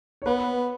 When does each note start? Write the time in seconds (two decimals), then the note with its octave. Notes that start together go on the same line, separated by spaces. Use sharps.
0.22 C#5
0.26 B3 B4